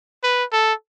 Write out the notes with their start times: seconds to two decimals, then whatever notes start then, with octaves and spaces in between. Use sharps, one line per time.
0.24 B4
0.53 A4